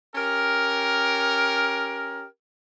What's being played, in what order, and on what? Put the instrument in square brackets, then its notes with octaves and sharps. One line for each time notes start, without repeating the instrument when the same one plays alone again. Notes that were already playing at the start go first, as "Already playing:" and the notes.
[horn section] C#4 G4 A#4